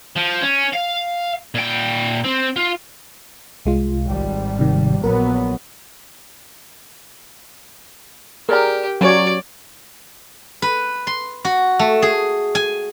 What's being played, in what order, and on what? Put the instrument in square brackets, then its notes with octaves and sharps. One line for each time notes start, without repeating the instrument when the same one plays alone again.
[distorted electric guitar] F3
C#4
F5
A#2 G5
C4
F4
[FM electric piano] C2 G#3 F4
[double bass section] G#1 G3
[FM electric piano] C3 D#3
[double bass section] A#1 F#3 B3 [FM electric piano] A#4
[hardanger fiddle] G4 [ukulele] G#4 D5 A#5 [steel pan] A#4
[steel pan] F#3 C#5 [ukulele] C#4 [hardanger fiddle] D5
[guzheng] B4
C6
F#4
A3
G#4
G#5